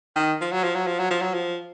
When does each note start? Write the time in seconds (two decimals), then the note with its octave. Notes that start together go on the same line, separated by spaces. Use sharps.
0.16 D#3
0.41 F3
0.52 F#3
0.64 F3
0.75 F#3
0.87 F3
0.99 F#3
1.10 F3
1.22 F#3
1.34 F3